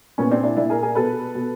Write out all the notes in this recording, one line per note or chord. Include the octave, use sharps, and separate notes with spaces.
A#2 B3 C#4
C4 D4
D4 E4
A#2 D4 E4
G#4 A#4
G#4 A#4
B2 A4 B4
B2